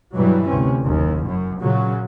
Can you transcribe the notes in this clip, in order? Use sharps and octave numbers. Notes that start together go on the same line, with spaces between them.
G2 B2 E3 F#3 G3
D2 C3 C4 C#4
F#1 D#2
F#2
A#2 C#3 F#3